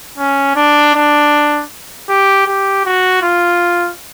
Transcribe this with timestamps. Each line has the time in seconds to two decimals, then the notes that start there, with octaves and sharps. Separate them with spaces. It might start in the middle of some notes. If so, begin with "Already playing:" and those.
0.18 C#4
0.56 D4
0.94 D4
2.09 G4
2.47 G4
2.85 F#4
3.22 F4